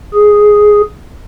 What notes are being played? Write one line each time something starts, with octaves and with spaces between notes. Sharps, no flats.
G#4